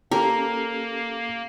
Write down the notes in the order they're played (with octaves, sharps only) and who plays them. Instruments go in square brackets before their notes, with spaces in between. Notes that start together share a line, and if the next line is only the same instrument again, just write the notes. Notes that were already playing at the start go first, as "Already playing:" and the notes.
[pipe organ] A#3 [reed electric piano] C#4 G4 A4 [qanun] A#4